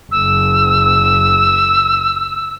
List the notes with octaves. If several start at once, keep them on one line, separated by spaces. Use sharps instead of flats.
F#1 E6